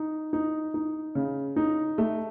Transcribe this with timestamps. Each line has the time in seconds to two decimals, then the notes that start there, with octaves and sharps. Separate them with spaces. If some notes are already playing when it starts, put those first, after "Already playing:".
Already playing: D#4
0.33 D#4
0.74 D#4
1.15 C#3
1.56 D#4
1.98 A3